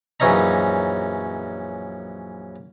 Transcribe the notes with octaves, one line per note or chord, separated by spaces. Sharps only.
A#1 F#2 E3 C#4 D#4 A#5